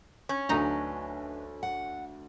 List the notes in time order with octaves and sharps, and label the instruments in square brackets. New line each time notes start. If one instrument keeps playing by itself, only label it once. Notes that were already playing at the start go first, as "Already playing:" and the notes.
[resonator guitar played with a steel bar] C#4
[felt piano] D2 D3 [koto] F#3 D#4 A#5 [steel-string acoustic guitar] D4 B4 D#5
[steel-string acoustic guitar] F#5